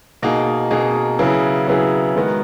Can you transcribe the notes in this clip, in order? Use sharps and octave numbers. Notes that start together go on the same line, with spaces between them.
B2 A#3 D#4 G#4
B2 A#3 D#4 G#4
C#3 F#3 B3 E4 G#4
C#3 F#3 B3 E4 G#4
D#3 G#3 B3 F#4 A#4